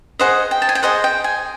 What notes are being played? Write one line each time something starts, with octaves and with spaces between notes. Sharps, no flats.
G#4 C5 D#5 F#5
G5
A5
G#5
G5
G#4 C5 D#5 F#5
G5
G#5